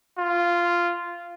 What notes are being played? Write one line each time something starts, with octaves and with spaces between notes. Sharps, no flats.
F4